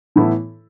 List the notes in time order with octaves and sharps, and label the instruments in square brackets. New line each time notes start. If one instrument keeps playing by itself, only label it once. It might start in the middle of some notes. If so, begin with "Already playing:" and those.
[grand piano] A2 E3 B3 E4 A4